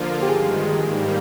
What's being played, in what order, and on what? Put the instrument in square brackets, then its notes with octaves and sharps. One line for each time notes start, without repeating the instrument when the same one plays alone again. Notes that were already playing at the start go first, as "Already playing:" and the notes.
Already playing: [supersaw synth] D3 F3 A#3 F4 [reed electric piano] C5
[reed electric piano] G4
[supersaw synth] G2 D#3 G#3 [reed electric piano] G#4
[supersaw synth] G#2 D#3 G3 A#3